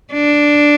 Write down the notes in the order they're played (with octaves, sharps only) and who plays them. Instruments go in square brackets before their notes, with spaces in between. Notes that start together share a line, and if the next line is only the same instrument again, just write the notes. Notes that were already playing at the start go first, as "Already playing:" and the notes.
[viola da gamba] D4